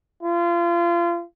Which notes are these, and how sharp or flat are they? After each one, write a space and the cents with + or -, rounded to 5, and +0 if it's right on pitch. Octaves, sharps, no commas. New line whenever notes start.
F4 -30